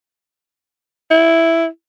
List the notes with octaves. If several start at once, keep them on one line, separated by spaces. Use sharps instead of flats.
E4